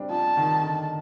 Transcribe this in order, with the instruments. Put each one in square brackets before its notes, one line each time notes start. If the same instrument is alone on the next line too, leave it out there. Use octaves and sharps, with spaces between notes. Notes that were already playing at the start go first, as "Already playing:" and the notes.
Already playing: [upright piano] G3 C4 D4
[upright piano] F3 [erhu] A5
[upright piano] D#3
D3